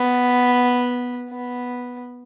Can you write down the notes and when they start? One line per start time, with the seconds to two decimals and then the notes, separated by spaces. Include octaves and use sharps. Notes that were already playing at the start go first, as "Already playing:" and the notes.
Already playing: B3
1.30 B3